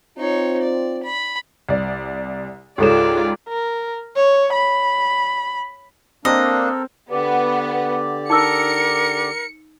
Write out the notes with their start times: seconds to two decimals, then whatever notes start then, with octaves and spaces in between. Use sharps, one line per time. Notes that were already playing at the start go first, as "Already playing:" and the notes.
0.18 C4 D#4 F4 C#5
0.63 D5
1.03 B5
1.69 C2 D5
2.78 C#2 G#2 F4 G4 A4 C#5 D5 E7
3.49 A#4
4.16 C#5
4.53 B5
6.25 A#3 C4 D4 A4 A#4 D#5
7.11 D3 B3 G4 D5
8.30 D#4 A#4 D6 E6 C#7